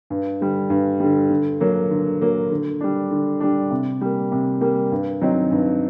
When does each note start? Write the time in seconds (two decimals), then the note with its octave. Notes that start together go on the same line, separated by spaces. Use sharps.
0.10 G2
0.41 D3 G3
0.70 G2
1.00 D3 G3
1.30 D3
1.60 F#3 A#3
1.90 D3
2.21 F#3 A#3
2.51 D3
2.81 G3 D4
3.11 D3
3.40 G3 D4
3.71 C3
4.01 G3 A#3
4.32 C3
4.61 G3 A#3
4.92 G2
5.21 F#3 C4 D#4
5.51 G2